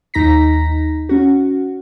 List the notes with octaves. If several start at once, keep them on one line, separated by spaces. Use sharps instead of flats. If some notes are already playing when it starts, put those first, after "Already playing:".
D#2 D#4 A#5 A#6 B6
C#4 F#4